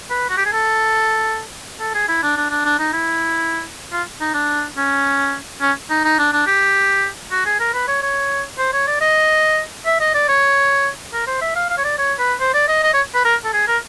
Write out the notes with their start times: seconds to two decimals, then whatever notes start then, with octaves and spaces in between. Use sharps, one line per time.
0.10 B4
0.29 F#4
0.37 G4
0.45 G#4
0.53 A4
1.80 A4
1.94 G#4
2.08 E4
2.23 D4
2.36 D4
2.50 D4
2.65 D4
2.79 D#4
2.93 E4
3.92 F4
4.20 D#4
4.34 D4
4.77 C#4
5.61 C#4
5.90 D#4
6.04 D#4
6.18 D4
6.33 D4
6.47 G4
7.31 F#4
7.45 G#4
7.60 A#4
7.74 B4
7.88 C#5
8.02 C#5
8.58 C5
8.73 C#5
8.87 D5
9.01 D#5
9.86 E5
10.00 D#5
10.14 D5
10.28 C#5
11.13 A#4
11.27 C5
11.41 E5
11.55 F5
11.70 F5
11.77 C#5
11.84 D5
11.98 C#5
12.19 B4
12.40 C5
12.54 D5
12.68 D#5
12.83 D#5
12.93 C#5
13.15 B4
13.25 A#4
13.44 A4
13.53 G#4
13.67 A#4